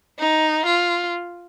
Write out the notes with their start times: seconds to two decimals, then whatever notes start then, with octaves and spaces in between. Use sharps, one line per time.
0.19 D#4
0.66 F4